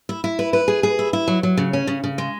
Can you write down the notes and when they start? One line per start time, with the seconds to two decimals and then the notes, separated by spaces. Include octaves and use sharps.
0.09 E4
0.24 E4
0.39 B4
0.53 B4
0.68 G#4
0.83 G#4
0.99 E4
1.13 E4
1.28 F#3
1.43 F#3
1.57 C#3
1.73 C#4
1.87 C#3
2.04 C#3
2.18 G#3